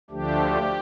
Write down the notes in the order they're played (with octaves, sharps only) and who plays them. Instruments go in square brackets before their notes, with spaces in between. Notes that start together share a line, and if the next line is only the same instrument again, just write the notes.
[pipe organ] D2 D3 F3 A3 D4 G4